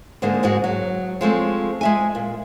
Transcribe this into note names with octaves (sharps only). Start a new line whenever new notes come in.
G#2 D3 G#3 A#3
F2 G#2 G#3 F#4
F#3
F3 G#3 A3 C4
G#3 E5 G#5
A#2